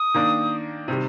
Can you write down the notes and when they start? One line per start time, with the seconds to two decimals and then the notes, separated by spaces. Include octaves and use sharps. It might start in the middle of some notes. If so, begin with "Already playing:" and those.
Already playing: D#6
0.14 D#3 A#3 D4
0.88 C3 D#3 G3